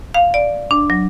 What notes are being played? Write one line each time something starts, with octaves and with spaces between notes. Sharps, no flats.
F5
D5
D4
F#3